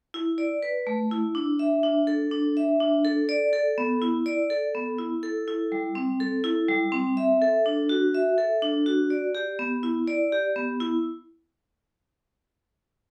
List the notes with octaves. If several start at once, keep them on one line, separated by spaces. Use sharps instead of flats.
E4
D5
B4
A3
E4
D4
E5
D4
A4
D4
E5
D4
A4
D5
A4
B3
E4
D5
A4
B3
E4
A4
E4
G3
C4
A4
E4
G3
C4
E5
A4
D4
F#4
E5
A4
D4
F#4
D5
G4
B3
E4
D5
G4
B3
E4